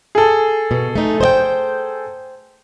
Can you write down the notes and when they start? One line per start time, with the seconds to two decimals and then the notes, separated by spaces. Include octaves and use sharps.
0.15 G#4 A4
0.71 B2
0.96 A3 D#4
1.21 C5 D#5 G5